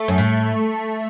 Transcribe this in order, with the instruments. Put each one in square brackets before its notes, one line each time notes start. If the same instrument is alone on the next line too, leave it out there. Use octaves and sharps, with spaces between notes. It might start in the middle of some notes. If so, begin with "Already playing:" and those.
Already playing: [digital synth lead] A3
[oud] F#2
A2